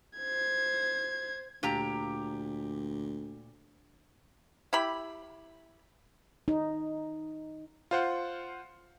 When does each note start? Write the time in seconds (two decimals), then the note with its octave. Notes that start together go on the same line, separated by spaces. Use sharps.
0.18 C5 G#6
1.63 D2 A#2 G4 A#5
4.73 E4 G4 B5
6.48 D#4
7.91 F4 C5 F#5